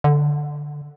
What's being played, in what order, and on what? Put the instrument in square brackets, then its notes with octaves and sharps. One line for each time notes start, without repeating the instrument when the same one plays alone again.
[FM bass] D3